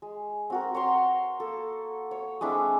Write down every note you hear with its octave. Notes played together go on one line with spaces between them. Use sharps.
G#3
C4 F#4 A#4
C#5 A#5 C6
A#3 A4
C#5
G#3 C4 D4 E4